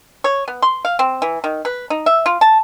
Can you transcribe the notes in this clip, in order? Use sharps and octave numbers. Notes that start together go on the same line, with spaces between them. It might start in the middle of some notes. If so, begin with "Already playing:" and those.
C#5
B3
C6
F5
C4
E3
D#3
B4
D#4
E5
F4
A5